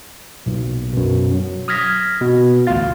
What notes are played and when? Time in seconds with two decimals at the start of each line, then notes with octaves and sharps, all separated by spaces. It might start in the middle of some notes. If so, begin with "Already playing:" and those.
0.46 B1 A#2
0.93 F#2 B2
1.34 F#3
1.68 D#6 F6 G#6 A#6 B6
2.21 B2
2.67 A1 D2 F4 F5 A6